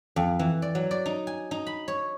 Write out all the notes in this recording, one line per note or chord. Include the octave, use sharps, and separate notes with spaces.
F2
E3
D5
F#3
D5
D#4
G#5
D#4
B5
C#5